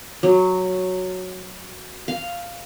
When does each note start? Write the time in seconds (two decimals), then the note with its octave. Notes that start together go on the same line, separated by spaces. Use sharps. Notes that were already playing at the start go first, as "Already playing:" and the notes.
0.23 F#3
2.08 F5